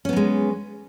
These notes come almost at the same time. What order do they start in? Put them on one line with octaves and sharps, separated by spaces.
C#4 B3 F#3 G#3